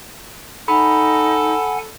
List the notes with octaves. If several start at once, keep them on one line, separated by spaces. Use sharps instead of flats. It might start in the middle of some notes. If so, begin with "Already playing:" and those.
D#4 A4 F#5 G#5 B5